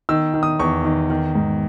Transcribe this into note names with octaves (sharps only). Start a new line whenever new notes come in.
D#3 E6
D#3
D#6
E2 C#6
D#3
D#3
G#2